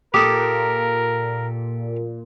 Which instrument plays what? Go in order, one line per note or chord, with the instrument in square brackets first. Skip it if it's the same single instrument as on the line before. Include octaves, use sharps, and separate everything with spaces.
[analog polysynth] A#2 [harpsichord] G4 A4 [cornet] A#4 [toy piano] D6 D#6